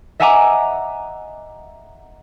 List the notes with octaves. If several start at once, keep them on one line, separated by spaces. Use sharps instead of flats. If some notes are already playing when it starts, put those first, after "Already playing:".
D#5 E5 F#5 G#5 A#5 D6